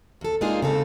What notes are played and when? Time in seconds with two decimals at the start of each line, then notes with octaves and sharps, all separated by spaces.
0.21 E2 A4
0.41 G#3 A#3 D4 D#4 F4 G#4
0.62 C#3 C4 A4